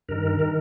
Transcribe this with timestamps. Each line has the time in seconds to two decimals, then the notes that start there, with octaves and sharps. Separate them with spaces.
0.09 G2 D#3 A#4
0.39 D#3 A#4